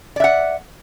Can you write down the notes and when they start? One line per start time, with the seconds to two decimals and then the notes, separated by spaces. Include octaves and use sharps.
0.16 D5
0.20 E5
0.24 F#5